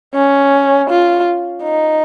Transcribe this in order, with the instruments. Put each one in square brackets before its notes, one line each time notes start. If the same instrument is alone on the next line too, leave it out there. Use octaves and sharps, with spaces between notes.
[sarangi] C#4
F4
D#4